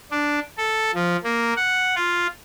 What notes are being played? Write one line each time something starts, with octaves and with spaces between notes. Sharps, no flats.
D4
A4
F3
A#3
F#5
F4